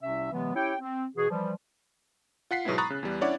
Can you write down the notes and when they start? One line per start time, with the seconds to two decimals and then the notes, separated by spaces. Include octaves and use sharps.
0.01 C2 C3 C#4 E5
0.32 C3 E3 F#3 G#3 B3
0.55 C#4 E4 G4 C#5 G5
0.79 C4
1.15 B2 E3 F#4 G#4
1.29 E3 F3 G3
2.51 F4 F#5 B6 C7
2.65 G#2 B2 F#3 G#3 B3 E4
2.78 A#5 B5 C#6 D#6 F#6 A6
2.90 C#3
3.03 E2 G3
3.21 C#4 D4 E4 C#5 D5 F#5